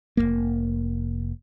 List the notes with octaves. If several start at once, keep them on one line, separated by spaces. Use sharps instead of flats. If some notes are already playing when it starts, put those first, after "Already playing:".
F1 D#2 A#3